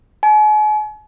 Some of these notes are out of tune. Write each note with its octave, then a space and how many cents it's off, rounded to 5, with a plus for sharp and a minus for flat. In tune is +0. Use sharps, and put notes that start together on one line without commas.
G#5 +40